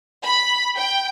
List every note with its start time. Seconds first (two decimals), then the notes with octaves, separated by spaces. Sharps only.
0.24 B5
0.77 G5